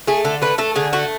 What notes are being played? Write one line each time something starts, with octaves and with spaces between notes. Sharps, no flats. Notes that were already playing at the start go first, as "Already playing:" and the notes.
A3 G#4
D3 A4
A3 B4
A3 A4
D3 G#4
A3 F#4